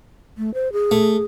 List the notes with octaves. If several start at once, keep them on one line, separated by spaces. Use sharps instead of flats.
A3
C5
G#4
A3